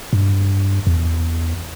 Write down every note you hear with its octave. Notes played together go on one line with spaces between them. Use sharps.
G2
E2